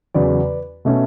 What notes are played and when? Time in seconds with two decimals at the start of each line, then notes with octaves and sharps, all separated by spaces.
0.14 E2 C#3 F#3 B4 D5
0.85 B2 A3 C#4